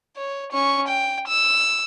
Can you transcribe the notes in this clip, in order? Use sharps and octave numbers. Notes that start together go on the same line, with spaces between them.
C#5
C#4 C#6
G5
E6